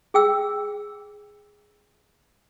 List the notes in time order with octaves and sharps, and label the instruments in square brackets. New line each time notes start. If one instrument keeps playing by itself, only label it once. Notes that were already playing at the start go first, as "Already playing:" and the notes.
[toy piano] G#4 G5 E6